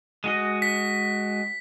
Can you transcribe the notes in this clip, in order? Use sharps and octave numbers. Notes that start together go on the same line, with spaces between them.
G#3 F#4 D#5
B6